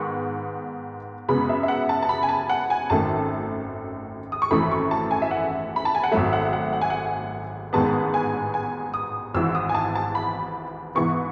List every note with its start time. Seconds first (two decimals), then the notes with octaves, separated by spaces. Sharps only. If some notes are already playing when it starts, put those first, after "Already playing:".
Already playing: G#2 D#3 G#3 B3 C#6
1.28 F#2 C#3 G#3 B3 B5
1.49 E5
1.63 E5
1.68 F#5
1.89 A5
2.03 A5
2.09 B5
2.23 G#5
2.29 A5
2.49 F#5
2.70 G#5
2.90 G#1 F#2 D#3 A3 A5
4.32 D#6
4.42 C#6
4.51 G#1 F#2 E3 A3 B5
4.72 C#6
4.91 A5
5.11 G#5
5.22 E5
5.31 F#5
5.76 B5
5.85 A5
5.95 G#5
6.03 F#5
6.11 G#1 G#2 F#3 A3 E5
6.33 F#5
6.53 F#5
6.73 F#5
6.81 G#5
6.90 F#5
7.73 A1 G#2 D#3 G#3 B3 A5
8.14 G#5
8.54 G#5
8.94 D#6
9.34 G#1 G#2 E3 E6
9.55 D#6
9.69 G#5
9.75 A5
9.95 A5
10.15 B5
10.95 G#2 E3 B3 C#6